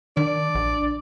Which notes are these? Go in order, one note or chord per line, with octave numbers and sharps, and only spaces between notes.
D#3 D4 D5
A#1